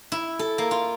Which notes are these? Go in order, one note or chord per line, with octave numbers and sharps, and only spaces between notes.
E4
A4
A#3
F4